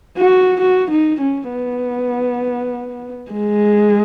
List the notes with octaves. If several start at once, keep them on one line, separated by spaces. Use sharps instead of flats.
F#4
F#4
D#4
C#4
B3
G#3